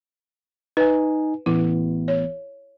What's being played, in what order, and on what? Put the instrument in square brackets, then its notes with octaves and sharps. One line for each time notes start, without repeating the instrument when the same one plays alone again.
[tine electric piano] D#4 G#5 [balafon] B4
[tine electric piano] A1 E3 B3 [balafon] E4
[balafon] C#5